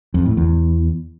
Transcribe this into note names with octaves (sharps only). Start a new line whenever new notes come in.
F2
A2
E2